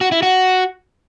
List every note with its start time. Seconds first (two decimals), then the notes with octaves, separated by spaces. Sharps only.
0.01 F#4
0.12 E4
0.23 F#4